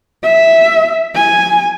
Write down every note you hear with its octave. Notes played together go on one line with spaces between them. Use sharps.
E5
G#5